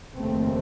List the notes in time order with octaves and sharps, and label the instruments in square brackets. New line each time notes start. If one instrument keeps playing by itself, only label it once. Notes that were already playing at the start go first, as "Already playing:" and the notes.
[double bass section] F1 D#2 C#3 A3 C4